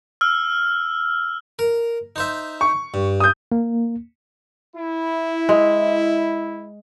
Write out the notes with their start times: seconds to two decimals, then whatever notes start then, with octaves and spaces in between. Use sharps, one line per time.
0.21 E6 F6
1.59 A#4
2.16 D#4 C5 E5
2.61 C#6
2.94 G2
3.20 D#6 G6
3.52 A#3
4.76 E4
5.49 G#3